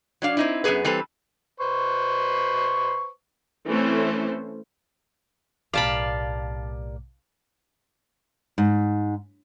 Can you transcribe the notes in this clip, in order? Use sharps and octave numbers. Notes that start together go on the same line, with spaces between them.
F#3 D4 F5
C4 D#4 E4
F#2 F3 B3 G#4 B4
E3 G3 C4 A4 B4
B4 C5 C#6
E3 A3 C4 C#4 A4 C5
B1 A2 A#3 G4 D5 F5 A5 B5
G#2